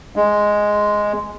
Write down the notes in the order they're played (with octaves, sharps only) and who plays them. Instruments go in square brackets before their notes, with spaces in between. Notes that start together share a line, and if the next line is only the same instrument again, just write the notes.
[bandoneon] G#3